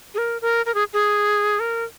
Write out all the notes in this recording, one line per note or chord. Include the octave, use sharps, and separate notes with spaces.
G#4
A#4
A#4
A#4
G#4
G#4
A#4